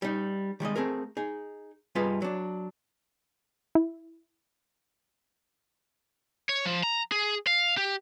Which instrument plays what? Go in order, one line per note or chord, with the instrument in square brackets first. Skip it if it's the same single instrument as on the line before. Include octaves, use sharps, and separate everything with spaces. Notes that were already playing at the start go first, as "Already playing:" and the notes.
[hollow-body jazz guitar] G3 D#4
D#3 G3 G#3 D#5
A3 C4 G#4 A#4
D#4 G#4
G2 G3 F4 G#4 B4 D#5
F#3 D4
[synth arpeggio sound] E4
[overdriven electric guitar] C#5
F3
A#5
G#4
F5
G4